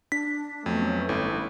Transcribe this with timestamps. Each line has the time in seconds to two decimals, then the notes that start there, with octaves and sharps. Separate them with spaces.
0.12 D4 B6
0.66 F2 F#3 A3 B3 C#4
1.09 G1 E4